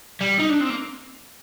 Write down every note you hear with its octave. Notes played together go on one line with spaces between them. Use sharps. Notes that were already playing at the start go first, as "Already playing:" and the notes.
G3
D#4
D4
C4
A#3